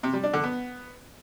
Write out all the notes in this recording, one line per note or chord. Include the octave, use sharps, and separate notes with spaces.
C3
G3
D4
D3
B3